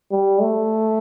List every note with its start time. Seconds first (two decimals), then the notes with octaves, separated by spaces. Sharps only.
0.11 G3
0.41 A3